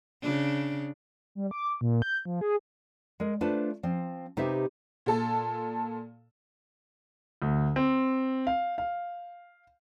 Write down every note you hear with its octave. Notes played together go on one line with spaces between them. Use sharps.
C#3 D4
G3
D6
A#2
G6
F3
G#4
G#3 A#4
A3 D4 F4 B4 C5 A5
F3 C4
C3 D#4 G4 B4 C5 E5
A#2 A4 A5
D2
C4
F5
F5